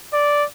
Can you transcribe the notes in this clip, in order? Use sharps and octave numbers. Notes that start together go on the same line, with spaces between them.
D5